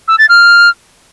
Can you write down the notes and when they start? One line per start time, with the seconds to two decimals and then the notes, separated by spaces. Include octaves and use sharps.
0.08 E6
0.18 A6
0.29 F6